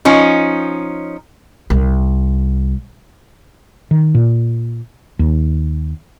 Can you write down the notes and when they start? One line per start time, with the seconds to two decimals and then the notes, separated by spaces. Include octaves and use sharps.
0.05 F3 C#4 D#4
1.70 C2
3.91 D#3
4.15 A#2
5.19 D#2